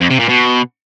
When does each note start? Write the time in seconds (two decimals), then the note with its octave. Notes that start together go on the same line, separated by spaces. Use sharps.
0.01 F2
0.10 C3
0.19 A#2
0.29 B2